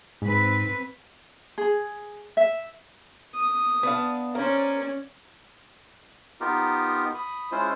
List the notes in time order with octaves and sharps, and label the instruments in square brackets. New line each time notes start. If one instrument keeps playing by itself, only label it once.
[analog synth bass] G#2 [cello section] C4 B4
[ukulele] G#4
E5
[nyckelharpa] D#6
[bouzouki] B3 D4 F5
[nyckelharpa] C#4 D5 [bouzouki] A#4 C5
[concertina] B3 D#4 F4 G4 A#4
B5 D#6
G#3 C#4 E4 F4 C5